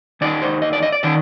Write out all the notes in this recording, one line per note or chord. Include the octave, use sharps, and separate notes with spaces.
D#2 D#3 D5
C5
D#5
D5
D#5
D5
D#3 D5